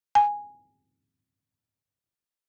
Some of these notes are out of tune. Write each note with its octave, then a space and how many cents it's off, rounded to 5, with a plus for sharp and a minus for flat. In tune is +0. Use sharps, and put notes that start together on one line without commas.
G#5 -10